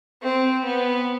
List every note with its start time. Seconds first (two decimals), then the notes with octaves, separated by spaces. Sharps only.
0.22 C4
0.64 B3